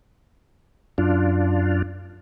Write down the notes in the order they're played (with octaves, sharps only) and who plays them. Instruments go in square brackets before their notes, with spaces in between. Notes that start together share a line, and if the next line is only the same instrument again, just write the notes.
[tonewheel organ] F#2 D4 F4